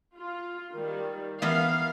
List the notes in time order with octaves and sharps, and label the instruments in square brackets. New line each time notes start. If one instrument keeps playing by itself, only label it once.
[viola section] F4
D#3 G3
[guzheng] E3 B3 B5 [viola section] A#4 F5